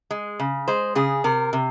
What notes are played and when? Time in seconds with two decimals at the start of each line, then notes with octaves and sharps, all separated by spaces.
0.11 G#3
0.40 C#3
0.68 G#3 C5
0.95 C#3 G#4
1.24 C3 A#4
1.53 C3